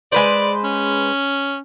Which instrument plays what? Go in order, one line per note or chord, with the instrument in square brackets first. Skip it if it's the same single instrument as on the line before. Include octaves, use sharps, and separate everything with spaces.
[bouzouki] G#3 B4 C5 [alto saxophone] D5
[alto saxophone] C#4